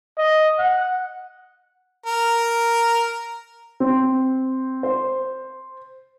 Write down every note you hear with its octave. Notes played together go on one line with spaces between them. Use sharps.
D#5
F#5
A#4
C4
C5